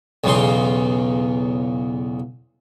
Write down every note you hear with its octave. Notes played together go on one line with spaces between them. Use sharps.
B1 E2 C#3 C6